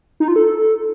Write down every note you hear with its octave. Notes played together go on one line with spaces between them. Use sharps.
D#4
F4
A4